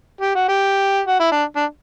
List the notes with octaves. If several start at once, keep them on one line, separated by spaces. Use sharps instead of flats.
G4
F#4
G4
F#4
E4
D4
D4